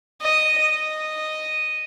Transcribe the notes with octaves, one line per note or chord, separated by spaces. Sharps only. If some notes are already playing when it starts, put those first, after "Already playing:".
D#5
D#5